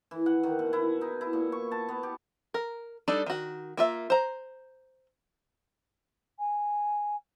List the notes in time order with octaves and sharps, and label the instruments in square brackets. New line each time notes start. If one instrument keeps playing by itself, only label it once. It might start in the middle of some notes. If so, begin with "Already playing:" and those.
[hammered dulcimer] E3
F#5
D#3
B2
E4
D#4
E4
A#2
C#6
A5
B3
G4
[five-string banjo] A#4
G3 D4 D#4 A4 D5
D#3 F#4
A#3 F4 E5
C5 A#5
[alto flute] G#5